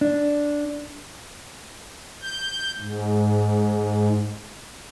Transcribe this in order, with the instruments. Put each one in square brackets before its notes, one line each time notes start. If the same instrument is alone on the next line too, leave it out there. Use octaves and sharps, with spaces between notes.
[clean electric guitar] D4
[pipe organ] G6
G#2